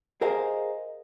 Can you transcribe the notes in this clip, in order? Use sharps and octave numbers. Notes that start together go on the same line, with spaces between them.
G#4 A#4 C5 D#5 F5 G#5